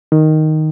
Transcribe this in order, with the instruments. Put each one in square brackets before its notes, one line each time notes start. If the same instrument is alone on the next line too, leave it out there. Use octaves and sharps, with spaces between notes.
[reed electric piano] D#3